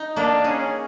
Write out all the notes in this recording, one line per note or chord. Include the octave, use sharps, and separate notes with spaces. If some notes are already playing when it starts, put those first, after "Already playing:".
Already playing: D#4
A#3 D4
C#4 G#4